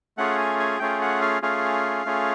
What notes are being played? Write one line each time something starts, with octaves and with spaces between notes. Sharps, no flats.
A3 C#4 F4 G#4 F#5
G#5
G#5
A3 C#4 F4 G#4 G5
F#5
F5
A3 C#4 F4 G#4 F5
A3 C#4 F4 G#4